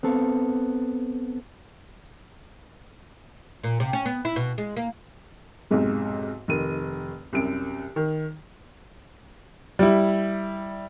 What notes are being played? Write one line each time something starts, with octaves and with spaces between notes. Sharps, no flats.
B3 C4 A4
A#2
C3
C#4
B3
E4
B2
G#3
A#3
B1 F2 G#2 C3 G#3
F1 D#3 D#7
C2 F#2 D7
D#3
G3 E4